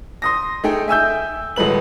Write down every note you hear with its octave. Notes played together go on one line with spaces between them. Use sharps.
C6 D#6 A#6
A3 D#4 G#4 G5
E5 G#5 E6 G6
D#1 G#3 A3 B4 F#7